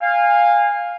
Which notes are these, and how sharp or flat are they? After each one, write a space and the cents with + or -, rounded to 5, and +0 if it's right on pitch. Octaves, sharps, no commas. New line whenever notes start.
F5 +5 G#5 -25